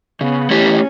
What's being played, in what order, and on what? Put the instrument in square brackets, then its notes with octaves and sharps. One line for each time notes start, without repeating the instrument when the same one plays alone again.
[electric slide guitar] C#3 [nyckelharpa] B3
[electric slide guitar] E3 A3 E4 G4 [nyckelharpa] C#4